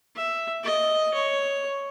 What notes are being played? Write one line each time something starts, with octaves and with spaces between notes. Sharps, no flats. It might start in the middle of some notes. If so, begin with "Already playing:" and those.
E5
D#5
C#5